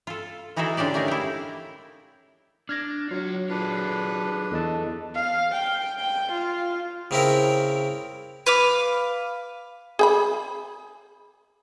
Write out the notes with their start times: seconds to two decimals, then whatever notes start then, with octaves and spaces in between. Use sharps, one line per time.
0.07 F4 A4
0.56 E3 D#4 E4 F#4 G#4 A4
0.77 D3 C#4 D4 G4 D5
0.94 A3 A#3 D#4 G#4 A#4
1.08 E4 G4
2.69 D4 F6 G#6 A#6
3.11 F#3 F4 C#5
3.50 D4 F4 G#4 A4 B4
4.51 E2 A4 D#5 A5
5.15 F5
5.52 G5
5.99 G5
6.32 F4
7.11 C#3 C4 E4 A#4
8.46 B4 F5 D6
9.99 G#4 G5 B5